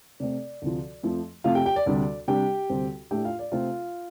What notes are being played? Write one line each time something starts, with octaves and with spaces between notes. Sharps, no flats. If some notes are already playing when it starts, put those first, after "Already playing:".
C3 A3 C4 D5
D2 C3 F3
F2 F3 A3
F2 C3 A3 F4 F5
G4 G5
G4 G5
D5
D2 C3 G3 D4 D5
C3 G3 D4 G4 G5
D2 C3 G3 C4
A2 A3 D4 G4 G5
F4 F5
D5
C3 A3 C4 F4 F5